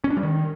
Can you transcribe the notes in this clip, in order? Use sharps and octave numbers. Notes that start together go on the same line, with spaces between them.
C#4
D4
G3
D#3